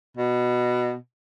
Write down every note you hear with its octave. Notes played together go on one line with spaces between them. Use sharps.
B2